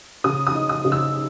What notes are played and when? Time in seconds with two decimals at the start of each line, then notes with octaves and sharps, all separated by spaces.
0.24 C#3 D#6
0.47 D#6
0.54 D#4
0.69 D#6
0.85 C#3
0.92 E6